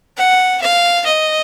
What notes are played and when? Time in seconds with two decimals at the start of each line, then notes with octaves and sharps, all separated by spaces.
0.17 F#5
0.61 F5
1.06 D#5